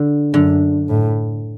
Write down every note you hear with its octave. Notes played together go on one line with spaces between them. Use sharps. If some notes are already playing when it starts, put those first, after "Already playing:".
Already playing: D3
F#2 D3
A2